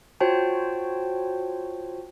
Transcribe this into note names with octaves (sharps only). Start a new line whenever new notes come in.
F4 F#4 C5 C#5 G5 A5